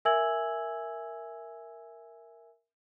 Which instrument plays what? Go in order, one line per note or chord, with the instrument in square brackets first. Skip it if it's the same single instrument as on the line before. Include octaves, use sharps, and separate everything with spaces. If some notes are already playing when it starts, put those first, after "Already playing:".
[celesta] A#4 E5 G#5 E6 G#6 F#7